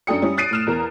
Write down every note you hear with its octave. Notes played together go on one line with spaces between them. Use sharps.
F#2 D4 A4 G5 D#6 C#7
G3 C#4 E4
D#6 F#6 A6 C7 D7 D#7
A2 F6 E7
E2 A#4 A#5